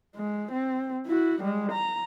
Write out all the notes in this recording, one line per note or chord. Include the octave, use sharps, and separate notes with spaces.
G#3
C4
E4 F#4
G3 G#3
A#5